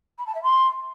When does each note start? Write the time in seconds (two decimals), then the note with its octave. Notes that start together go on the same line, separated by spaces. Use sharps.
0.18 B5
0.27 A5
0.35 E5
0.43 C6